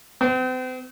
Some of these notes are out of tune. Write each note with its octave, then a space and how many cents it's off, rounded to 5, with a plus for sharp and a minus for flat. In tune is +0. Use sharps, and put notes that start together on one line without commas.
C4 -40